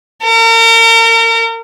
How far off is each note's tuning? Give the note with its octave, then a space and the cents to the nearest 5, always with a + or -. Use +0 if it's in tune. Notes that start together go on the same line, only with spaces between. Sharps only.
A#4 -35